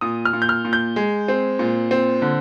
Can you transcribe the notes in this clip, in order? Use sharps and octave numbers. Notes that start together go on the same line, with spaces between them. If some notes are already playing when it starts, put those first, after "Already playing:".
A#2 D#6
F6
A#2
G6
F6
A#2
G6
G#3
C4
A#2
C4
D3